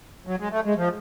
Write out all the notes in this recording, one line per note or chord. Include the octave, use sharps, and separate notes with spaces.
F#3
G#3
A3
G#3
F3